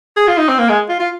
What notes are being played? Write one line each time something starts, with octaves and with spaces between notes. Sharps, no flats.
G#4
F4
D#4
C4
A#3
G#3
F4
F4